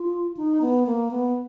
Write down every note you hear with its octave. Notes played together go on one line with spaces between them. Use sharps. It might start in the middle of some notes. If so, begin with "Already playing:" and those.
Already playing: F4
D#4
B3
A#3
B3